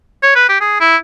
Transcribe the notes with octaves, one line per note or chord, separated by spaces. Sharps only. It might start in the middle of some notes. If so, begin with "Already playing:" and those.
C#5
B4
G4
G#4
E4